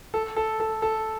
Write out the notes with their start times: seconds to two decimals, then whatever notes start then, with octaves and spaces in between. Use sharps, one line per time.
0.14 A4
0.36 A4
0.60 A4
0.82 A4